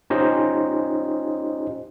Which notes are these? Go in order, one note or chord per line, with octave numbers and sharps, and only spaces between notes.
C#4 D#4 F4 G4 C5 D#5